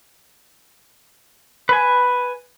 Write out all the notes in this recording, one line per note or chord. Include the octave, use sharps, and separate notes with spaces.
B4 G#5